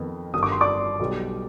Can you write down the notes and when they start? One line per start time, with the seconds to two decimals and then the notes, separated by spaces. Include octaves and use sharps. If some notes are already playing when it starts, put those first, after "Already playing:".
Already playing: F2 D#3 B3
0.33 G1 G2 D#3 D#6
0.43 D6
0.52 C6
0.61 D5 D6
1.00 B1 B2 G3 B3